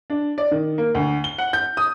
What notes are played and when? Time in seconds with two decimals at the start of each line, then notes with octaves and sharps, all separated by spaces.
0.10 D4
0.38 D5
0.51 D#3
0.78 A#3
0.95 D2
1.24 G7
1.38 F#5
1.53 G6
1.77 D#6